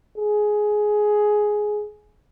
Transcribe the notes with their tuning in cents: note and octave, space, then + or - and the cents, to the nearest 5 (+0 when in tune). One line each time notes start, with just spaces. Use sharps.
G#4 +10